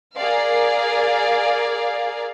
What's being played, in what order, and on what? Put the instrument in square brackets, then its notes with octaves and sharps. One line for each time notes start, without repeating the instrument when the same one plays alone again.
[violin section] G#4 A#4 D5 F5